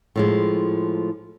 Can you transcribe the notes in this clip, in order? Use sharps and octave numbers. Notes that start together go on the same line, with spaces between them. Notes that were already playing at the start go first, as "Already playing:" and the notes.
A2 F3 G#3